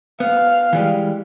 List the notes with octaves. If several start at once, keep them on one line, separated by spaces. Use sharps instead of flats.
B3 F5
E3 G3 G#3